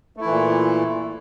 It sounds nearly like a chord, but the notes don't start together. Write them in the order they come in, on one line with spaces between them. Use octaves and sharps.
A3 E4 E3 A#2